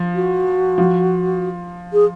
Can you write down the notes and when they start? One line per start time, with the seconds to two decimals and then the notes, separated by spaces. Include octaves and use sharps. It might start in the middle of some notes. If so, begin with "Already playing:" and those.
Already playing: F3
0.15 F#4
0.78 F3
1.93 G#4